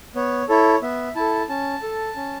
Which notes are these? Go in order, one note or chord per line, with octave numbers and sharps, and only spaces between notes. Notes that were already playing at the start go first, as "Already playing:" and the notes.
B3 C#5
E4 A4 C#5
B3 E5
E4 A4 A5
C#4 A5
A4
C#4